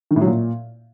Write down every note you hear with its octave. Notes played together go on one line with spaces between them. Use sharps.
D#3
A2
F#3
A#2